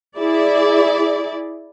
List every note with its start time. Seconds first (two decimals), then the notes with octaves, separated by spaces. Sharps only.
0.18 E4 G#4 D5